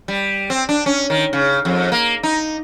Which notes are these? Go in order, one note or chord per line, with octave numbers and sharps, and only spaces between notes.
G3
C4
D4
C#4
D#3
C#3
F2
A#3
D#4